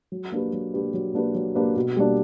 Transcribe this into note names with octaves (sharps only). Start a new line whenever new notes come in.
F#3
A#3 D4 G4 B4
F#3
A#3 D4 G4 B4
F#3
A#3 D4 G4 B4
F#3
A#3 D4 G4 B4
B2
G3 A#3 D4